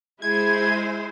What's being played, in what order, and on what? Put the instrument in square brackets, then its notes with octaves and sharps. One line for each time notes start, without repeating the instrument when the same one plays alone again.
[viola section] G#3 E4 C5 [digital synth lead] G#6